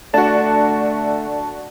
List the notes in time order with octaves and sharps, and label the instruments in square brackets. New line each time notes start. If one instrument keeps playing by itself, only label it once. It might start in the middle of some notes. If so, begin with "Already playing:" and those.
[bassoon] D3 [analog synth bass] A3 [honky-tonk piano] D4 F#4 [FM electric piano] A5